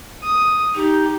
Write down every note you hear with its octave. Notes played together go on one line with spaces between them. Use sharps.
D#6
D#4 G4